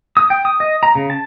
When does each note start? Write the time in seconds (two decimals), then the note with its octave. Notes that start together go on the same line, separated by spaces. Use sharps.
0.17 D#6
0.30 G5
0.45 D#6
0.60 D#5
0.83 A#5
0.95 C#3
1.10 A5